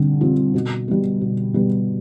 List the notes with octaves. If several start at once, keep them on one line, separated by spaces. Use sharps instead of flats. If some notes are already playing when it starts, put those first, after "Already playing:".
Already playing: D3 G3 C4
G3 C4 F4
B2
G3 B3
B2
G3 B3